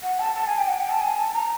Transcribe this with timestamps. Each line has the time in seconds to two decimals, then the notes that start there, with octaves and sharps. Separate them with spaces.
0.03 F#5
0.20 A5
0.36 A5
0.47 G#5
0.58 G5
0.68 F#5
0.80 G5
0.90 A5
1.01 G#5
1.17 A5
1.34 A#5